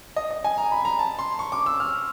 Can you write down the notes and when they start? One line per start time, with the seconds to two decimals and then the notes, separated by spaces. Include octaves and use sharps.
0.16 D#5
0.31 D#5
0.44 G#5
0.58 A#5
0.72 B5
0.85 A#5
0.99 A5
1.19 C6
1.39 C#6
1.52 D6
1.66 E6
1.80 F6